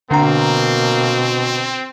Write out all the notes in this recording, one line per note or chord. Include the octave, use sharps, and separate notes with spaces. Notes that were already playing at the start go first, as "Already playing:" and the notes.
B2 D3 A#3 C4 D4 A#5